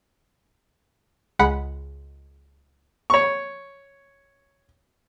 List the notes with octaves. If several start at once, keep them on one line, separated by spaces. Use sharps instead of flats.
C#2 G#3 F#5 B5
C#5 C#6